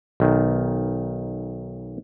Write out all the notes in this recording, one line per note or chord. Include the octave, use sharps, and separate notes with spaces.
B1 D#3